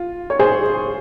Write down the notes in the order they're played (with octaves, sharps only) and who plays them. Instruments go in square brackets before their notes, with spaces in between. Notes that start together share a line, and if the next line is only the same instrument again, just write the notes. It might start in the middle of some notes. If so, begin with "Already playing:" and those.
Already playing: [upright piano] F4
C#5
G#4 C5